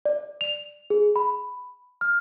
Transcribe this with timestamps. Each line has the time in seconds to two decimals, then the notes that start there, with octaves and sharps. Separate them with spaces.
0.05 D5
0.41 F7
0.90 G#4
1.16 B5
2.01 F6